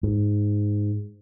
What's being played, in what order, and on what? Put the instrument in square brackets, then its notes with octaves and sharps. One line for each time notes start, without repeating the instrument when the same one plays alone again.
[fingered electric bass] G#2